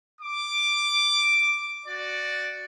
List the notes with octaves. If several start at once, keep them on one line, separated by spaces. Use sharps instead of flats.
D6
F#4 D5